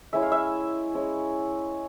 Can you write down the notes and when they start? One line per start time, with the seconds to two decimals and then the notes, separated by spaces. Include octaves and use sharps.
0.13 G#3 C#4 E4 E5
0.22 F5
0.32 E5
0.94 G#3 C#4 E4